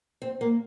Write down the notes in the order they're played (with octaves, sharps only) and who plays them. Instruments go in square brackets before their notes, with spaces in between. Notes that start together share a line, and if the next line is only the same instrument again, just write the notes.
[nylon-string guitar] C4
A#3